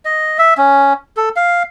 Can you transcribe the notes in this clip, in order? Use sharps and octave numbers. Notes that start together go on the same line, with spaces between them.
D#5
E5
C#4
A4
F5